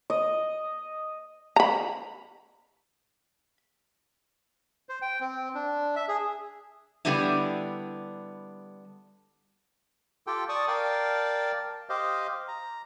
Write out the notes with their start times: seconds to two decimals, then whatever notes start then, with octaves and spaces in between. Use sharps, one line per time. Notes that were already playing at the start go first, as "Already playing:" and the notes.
0.10 D#5
1.56 A#5 B5
4.89 C5
5.02 G5
5.21 C4
5.55 D4
5.96 E5
6.08 G#4
7.05 D3 G3 B3 D4 E4
10.27 F4 G4 A4 G5
10.49 D5 A5 C#6 D#6
10.68 A#4 D5 F5 G5 A5
11.89 G4 C5 D#5 F5
12.48 A#5